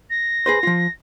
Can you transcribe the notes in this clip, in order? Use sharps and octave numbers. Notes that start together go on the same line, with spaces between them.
A#6
G#4 B4 C5
F3 F4